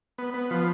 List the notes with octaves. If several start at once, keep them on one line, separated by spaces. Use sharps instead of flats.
B3
B3
F3